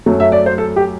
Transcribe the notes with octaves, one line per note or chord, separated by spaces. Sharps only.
F#2 F#3 A3
E5
D5
C5
A4
G4